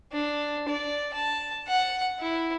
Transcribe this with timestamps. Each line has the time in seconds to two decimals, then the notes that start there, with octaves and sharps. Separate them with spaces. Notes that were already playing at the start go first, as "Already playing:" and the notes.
0.12 D4
0.68 D5
1.14 A5
1.68 F#5
2.20 E4